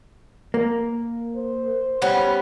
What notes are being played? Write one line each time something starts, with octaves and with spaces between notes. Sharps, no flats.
A#3
C5
G3 B3 C#4